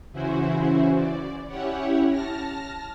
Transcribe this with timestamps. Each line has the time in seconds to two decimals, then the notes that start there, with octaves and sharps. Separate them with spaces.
0.13 C#3 E3 C#4 E4 F#4 C5
0.95 D5
1.48 C#4 E4 G4 C#5 F#5
2.10 A5 F6 A#6